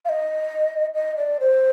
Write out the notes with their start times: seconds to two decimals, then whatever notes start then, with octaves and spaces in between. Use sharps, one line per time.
0.05 F5
0.09 D#5
0.95 D#5
1.17 D5
1.40 C5